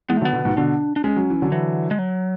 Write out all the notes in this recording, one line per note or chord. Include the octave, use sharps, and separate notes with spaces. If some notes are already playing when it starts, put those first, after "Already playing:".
E3 G#3 B3
A3
D3 F#3
B3
B2 D3
G#2 B2
B2 D3 D4
D4
G#3 C#4
F#3
E3
D3 F#3
E3
G#3
F#3